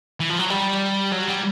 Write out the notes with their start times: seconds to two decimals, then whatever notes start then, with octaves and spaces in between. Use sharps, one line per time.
0.20 E3
0.29 F3
0.39 F#3
0.50 G3
1.12 F#3
1.28 G3